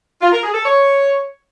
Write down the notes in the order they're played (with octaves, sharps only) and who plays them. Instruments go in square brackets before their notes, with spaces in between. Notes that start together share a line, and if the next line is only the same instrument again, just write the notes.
[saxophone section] F4
A#4
G#4
A4
C#5